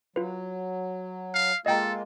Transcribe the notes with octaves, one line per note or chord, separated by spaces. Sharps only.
F#3 F4 B4
F5
G#3 A#3 F4 A4 D#5 G5 A#5